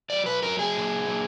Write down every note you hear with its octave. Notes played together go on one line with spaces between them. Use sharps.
F#3 D5
B4
F#3 A#4
G#4
A#2
A#2